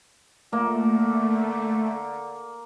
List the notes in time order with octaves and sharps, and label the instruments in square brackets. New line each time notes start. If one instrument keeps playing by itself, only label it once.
[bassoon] D3 [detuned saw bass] A3 [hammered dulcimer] A#3